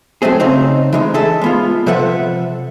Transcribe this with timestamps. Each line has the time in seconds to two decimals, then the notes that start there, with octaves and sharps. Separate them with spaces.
0.22 F#3 G#3 A3 C4 G#4
0.40 C#3 C4 D#4
0.93 E3 G#3 D#4
1.14 G#4 A4 E5
1.41 G#3 B3 F4
1.86 C3 F3 A4 B4 E5 F#5